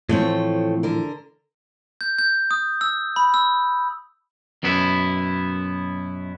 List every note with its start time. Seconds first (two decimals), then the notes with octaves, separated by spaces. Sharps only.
0.09 A2 E3 F3 A3 C4 C#5
0.83 D3 A#4
2.01 G6
2.18 G6
2.51 D#6
2.81 E6
3.16 B5
3.34 E6
4.63 F#2 B2 B3 E4